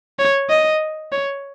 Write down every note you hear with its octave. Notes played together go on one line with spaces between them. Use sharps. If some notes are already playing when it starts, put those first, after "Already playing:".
C#5
D#5
C#5